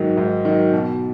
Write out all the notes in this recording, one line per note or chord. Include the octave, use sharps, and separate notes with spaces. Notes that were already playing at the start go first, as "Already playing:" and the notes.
Already playing: G#2 D#3 F#3
G#2
D#3 F#3
B2